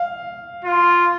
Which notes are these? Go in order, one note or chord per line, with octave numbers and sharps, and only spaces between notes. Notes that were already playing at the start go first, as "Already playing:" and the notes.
Already playing: F5
F4